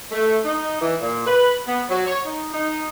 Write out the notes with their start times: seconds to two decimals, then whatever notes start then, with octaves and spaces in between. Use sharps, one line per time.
0.12 A3
0.44 D#4
0.81 E3
1.00 A#2
1.26 B4
1.67 B3
1.90 F#3
2.06 C#5
2.25 D#4
2.52 D#4